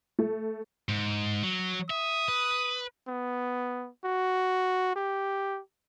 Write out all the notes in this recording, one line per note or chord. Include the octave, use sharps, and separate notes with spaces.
A3
G#2
F#3
E5 D#6
B4
B3
F#4
G4